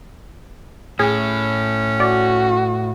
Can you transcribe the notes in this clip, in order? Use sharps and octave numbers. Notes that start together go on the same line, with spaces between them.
A2 C#4 G#4
F#4 D5